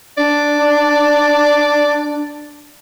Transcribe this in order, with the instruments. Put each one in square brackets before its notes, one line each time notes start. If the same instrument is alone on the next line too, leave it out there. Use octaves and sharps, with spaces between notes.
[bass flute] D4 [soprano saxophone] D5